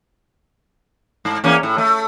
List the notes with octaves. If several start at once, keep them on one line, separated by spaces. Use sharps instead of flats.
G#2
E2 A#3 C#4
A2
A3